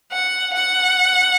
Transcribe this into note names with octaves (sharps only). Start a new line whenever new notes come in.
F#5
F#5